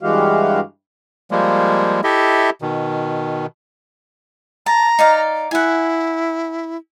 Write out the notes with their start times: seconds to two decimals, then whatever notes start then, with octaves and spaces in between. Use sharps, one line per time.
0.03 G2 E3 G#3 F#4 G4 F5
1.31 F3 G3 G#3 A#3
2.04 E4 G4 A4 D#5 E5
2.62 B2 D#3
4.66 A5 A#5
4.99 D#4 D5 F5
5.51 E4 F#5 G#5